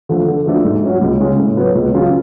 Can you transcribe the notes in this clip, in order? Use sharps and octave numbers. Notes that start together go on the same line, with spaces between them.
D3 F3 A3
D3
F3 A3 D4 F#4
G#2
F#3 C#4 F#4
C#2
C#3 G#3 C#4
A2
F#3 B3 F#4 C#5
C#2
C#3 F#3 C#4 F4